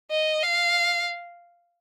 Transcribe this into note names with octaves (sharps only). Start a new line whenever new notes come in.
D#5
F5